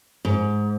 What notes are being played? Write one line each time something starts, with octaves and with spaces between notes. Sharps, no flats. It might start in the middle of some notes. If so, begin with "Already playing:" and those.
G#2